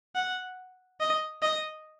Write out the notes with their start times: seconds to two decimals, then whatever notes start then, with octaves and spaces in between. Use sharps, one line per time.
0.15 F#5
1.00 D#5
1.42 D#5